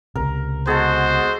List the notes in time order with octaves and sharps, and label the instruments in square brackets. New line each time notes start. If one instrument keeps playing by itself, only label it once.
[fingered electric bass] C#2 C3 [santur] A#4
[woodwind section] G#3 B3 F#4 [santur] G#4 A4 [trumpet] C5